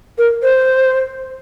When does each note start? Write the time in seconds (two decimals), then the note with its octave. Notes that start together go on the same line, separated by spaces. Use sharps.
0.18 A#4
0.43 C5